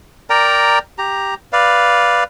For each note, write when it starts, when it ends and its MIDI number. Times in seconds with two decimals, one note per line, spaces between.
0.30 0.79 70
0.30 0.79 74
0.30 0.79 79
0.30 0.79 82
0.98 1.34 67
0.98 1.34 82
1.53 2.24 71
1.53 2.24 74
1.53 2.24 77